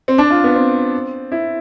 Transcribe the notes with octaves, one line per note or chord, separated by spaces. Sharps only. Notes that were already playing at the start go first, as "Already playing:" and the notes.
C4
D4
F4
B3
C4
E4